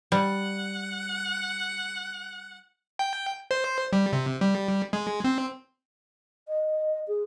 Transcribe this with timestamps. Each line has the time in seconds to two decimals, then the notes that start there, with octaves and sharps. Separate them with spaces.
0.12 G3 F#5
2.99 G5
3.51 C5
3.93 G3
4.13 C3
4.41 G3
4.93 G#3
5.24 C4
6.48 D#5
7.07 G#4